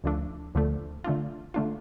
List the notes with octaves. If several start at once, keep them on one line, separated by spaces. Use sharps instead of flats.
D2 D3 F3 A3 D4
D2 D3 F3 A3 D4
D3 A3 D4 F4
D3 A3 D4 F4